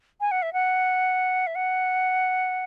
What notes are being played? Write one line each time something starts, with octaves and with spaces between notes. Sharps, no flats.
G#5
F#5
E5
F#5
E5
F#5